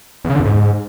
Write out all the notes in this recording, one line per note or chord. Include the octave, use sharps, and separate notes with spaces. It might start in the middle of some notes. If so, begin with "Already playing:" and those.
E2
C#3
D3
E2
G#2